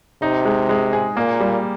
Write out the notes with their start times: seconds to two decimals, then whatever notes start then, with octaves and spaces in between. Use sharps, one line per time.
0.22 C3 D#4
0.45 G#3
0.69 G#3
0.93 G#4
1.16 A#2 A#3
1.40 G3